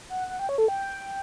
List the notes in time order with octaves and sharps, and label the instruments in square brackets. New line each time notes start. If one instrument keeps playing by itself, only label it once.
[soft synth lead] F#5
F#5
G5
C#5
A4
G5